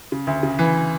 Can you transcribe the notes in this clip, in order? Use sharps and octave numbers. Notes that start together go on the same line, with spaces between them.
C#3
D2
C#3
E3